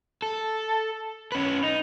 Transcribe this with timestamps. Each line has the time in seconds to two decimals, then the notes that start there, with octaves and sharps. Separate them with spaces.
0.22 A4
1.32 C#4 B4
1.63 D#4